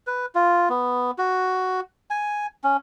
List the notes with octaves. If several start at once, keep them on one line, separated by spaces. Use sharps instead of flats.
B4
F4
B3
F#4
G#5
C#4